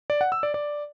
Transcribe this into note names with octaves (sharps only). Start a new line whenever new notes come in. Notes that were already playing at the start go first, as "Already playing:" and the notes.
D5
F#5
E6
D5
D5